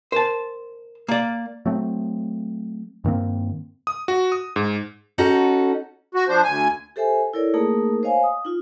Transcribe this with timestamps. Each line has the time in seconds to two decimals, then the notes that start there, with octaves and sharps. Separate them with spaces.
0.12 A#4 C5 A5
1.08 A#3 D5
1.66 F#3 A3 C4
3.04 G2 D#3 A#3 C4
3.87 D#6
4.08 F#4
4.32 D#6
4.56 G#2
5.18 C#4 D#4 F#4 A4
6.15 F#4
6.28 F3 D4 C5
6.44 D2 G#5
6.96 G4 A4 C5 E5 G#5
7.34 E4 A4 A#4 C#5 D5
7.54 A3 A#3 D#4 G#4 A#4
8.03 C5 C#5 D#5 F5 G#5
8.23 D#6
8.45 D#4 F4